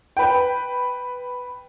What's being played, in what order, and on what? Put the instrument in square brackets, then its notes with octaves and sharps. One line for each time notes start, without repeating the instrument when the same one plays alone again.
[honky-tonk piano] B4 G5